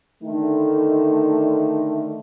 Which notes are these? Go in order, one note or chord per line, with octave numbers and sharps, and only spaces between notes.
D3 D#3 A3